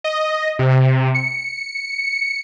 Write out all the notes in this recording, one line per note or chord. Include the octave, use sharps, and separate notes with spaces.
D#5
C3
C#7